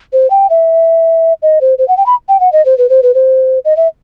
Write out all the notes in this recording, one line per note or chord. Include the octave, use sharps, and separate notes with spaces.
C5
G5
E5
D#5
C5
C5
F#5
G5
B5
G5
F#5
D#5
C5
B4
C5
B4
C5
D#5
E5